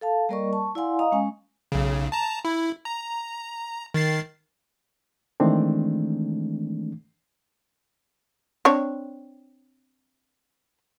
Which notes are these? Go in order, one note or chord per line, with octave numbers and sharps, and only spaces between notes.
A4 F5 A5
G3 A#3 A#4 D5 D#5 C#6
A5 C#6
E4 D5 F5 F#5 G#5 C6
D#5 F5 A#5 D#6
G#3 C#4 G#5
B1 C#3
A5 A#5
E4
A#5
D#3 A6 C7
D#3 E3 G#3 A3 C4 D4
C4 D4 C#5